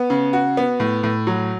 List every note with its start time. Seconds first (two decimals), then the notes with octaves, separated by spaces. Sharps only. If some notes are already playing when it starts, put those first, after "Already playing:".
Already playing: B3
0.10 C#3
0.33 F#4
0.57 B3
0.80 A2
1.03 A2
1.27 F#3